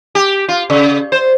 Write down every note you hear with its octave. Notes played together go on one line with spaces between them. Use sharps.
G4
F4
C#3
C5